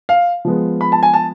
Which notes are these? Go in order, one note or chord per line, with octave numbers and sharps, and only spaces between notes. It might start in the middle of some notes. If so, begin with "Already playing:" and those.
F5
F3 G#3 B3
B5
A5
G#5
A5